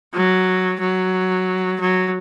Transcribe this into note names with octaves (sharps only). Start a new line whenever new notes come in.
F#3
F#3
F#3